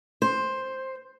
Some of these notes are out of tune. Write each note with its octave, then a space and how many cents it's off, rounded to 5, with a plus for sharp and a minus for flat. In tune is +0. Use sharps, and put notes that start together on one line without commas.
C5 +5